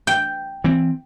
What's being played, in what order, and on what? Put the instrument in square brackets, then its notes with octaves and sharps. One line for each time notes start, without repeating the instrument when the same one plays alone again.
[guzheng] G5
[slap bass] E3 C4